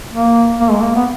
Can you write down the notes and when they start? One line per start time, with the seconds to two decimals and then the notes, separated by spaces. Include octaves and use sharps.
0.13 A#3
0.60 A#3
0.71 G#3
0.83 A#3
0.95 B3